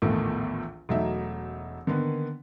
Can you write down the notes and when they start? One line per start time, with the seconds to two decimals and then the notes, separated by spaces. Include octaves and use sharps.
0.02 A#1 E2 A2 D#3 F3 A3
0.89 E1 F#3 A3 D#4 E5
1.87 D3 D#3 A#3 B3 B4